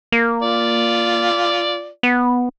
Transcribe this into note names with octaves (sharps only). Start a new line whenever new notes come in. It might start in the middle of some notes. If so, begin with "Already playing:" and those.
A#3
F4 D5
B3